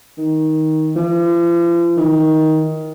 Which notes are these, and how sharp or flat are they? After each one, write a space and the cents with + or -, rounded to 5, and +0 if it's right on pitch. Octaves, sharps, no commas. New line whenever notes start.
D#3 +10
F3 -45
D#3 +15